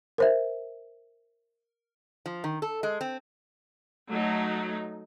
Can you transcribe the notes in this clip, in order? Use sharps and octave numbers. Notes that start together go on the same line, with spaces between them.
A#4 C5 E5
F3
D#3
A4
G#3
C4
F#3 A3 D#4